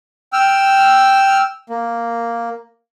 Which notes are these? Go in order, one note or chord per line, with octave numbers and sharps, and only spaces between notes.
G5 E6 F6
A#3